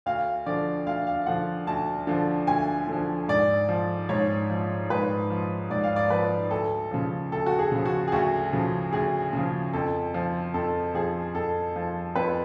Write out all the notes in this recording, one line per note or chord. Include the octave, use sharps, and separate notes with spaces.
D2 F5
D3 F3 D5
D2 F5
F5
D3 F3 F#5
D2 A5
D3 F3
D2 G#5
D3 F3
G#2 D5
F3
G#2 C#5
F3
G#2 B4
F3
G#2 D5
F5
D5
F3 B4
D2 A4
C#3 F3
D2 A4
F#4
G#4
C#3 F3
F#4
G#4
D2 F#4
C#3 F3
D2 G#4
C#3 F3
F2 A4
F3
F2 A4
F3 G#4
F2 A4
F3
F2 B4